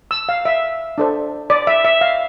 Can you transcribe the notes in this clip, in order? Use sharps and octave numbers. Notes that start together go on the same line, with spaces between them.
E6
F5
E5
D4 A4 C5
D5
E5
E5
F5